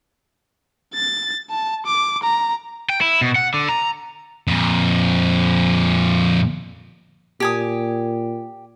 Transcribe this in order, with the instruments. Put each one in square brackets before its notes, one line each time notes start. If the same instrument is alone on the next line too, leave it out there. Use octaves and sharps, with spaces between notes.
[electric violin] A6
A5
D6
A#5
[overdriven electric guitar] G5
E4
B2
F#5
D3
A#5
[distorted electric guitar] F2 A#2
[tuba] A#2 [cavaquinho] G4 G#5 D#6